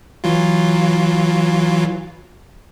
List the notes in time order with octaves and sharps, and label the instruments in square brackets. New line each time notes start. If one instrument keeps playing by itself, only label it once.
[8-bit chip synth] E3 F#3 F4